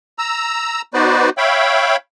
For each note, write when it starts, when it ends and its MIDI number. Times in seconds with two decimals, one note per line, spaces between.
0.18 0.81 82
0.18 0.81 88
0.94 1.30 59
0.94 1.30 63
0.94 1.30 66
0.94 1.30 71
0.94 1.30 72
0.94 1.30 74
1.37 1.96 73
1.37 1.96 76
1.37 1.96 77
1.37 1.96 79
1.37 1.96 83